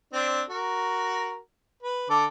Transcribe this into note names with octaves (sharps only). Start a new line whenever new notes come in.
C4 D4
F#4 A#4
B4
D3 A4 D6